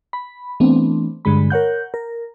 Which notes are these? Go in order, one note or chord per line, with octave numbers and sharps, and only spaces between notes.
B5
E3 A3 B3 C4 D4
G2 D3 G#3 B5
A#4 C#5 F#5 G6
A#4